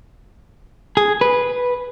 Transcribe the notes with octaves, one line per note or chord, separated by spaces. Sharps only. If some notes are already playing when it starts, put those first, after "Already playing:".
G#4
B4